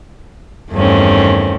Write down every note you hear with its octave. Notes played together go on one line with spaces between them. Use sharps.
E2 G2 D#3 A3 C4 C#4